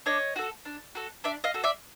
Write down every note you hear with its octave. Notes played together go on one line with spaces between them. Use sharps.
D4 C#5 D#5
F#4 A4
D4
F#4 A4
D4 D5 E5
D#5 F5
F#4 A4
D5 E5